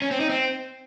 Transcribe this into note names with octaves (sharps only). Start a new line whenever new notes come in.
C#4
C4
D#4
C4